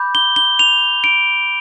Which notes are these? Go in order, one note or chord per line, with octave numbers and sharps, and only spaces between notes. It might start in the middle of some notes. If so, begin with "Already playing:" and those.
Already playing: B5 D6 G6
G7
G7
F7
D7